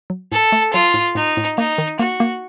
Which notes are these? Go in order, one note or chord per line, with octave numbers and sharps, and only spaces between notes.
F#3
A2 A4
A3
F#3 F4
A2
A2 D#4
A2
A#3 D#4
D#3
A#3 F#4
A#3